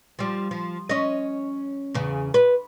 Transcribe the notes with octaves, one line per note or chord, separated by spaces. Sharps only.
F3 G3
F3
C#4 D#5
E2 C#3
B4